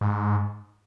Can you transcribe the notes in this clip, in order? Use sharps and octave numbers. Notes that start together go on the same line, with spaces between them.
G#2